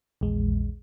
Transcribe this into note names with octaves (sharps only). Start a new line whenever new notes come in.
A#1 E2 G#3